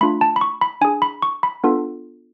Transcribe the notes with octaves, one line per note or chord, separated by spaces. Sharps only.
A3 D4 F4 B5
A5
B5
C#6
B5
D4 G#4 G#5
B5
C#6
B5
B3 D4 F4 A4